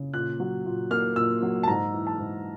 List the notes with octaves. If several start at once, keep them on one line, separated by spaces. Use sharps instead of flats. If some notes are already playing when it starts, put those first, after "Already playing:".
Already playing: C#3
A#2 F#6
F#3
A#2
A#3 F6
A#2 E6
F#3
A5
G#2 A#5
E3
A5
G#2